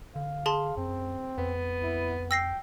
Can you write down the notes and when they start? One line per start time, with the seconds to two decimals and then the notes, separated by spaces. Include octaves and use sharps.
0.16 D3 F5
0.46 G#4 A5 C6
0.77 F#2 C4
1.38 F2 B3
1.83 E4
2.31 G5 E6 A#6 C7